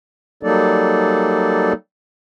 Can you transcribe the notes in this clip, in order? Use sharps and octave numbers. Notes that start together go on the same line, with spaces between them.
F#3 G3 A#3 D#4 A4 D5